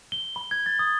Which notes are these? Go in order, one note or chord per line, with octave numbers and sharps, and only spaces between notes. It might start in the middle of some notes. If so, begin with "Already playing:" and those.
G7
B5
G#6
A6
D#6